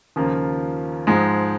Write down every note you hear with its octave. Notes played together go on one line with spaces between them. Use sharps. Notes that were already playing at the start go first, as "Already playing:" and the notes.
D#2 C#3 F3 A#3 F4
G#2 F3 G#3